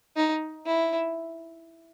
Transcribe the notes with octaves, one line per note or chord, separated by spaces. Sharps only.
D#4
E4